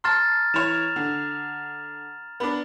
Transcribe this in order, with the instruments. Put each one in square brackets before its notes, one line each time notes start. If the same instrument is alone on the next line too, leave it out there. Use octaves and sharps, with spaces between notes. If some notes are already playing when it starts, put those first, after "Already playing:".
[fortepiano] A5 C6 [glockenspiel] A#5 F6 A6
[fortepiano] E3 C#5 F6 [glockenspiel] E7 F7
[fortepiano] D3
B3 D4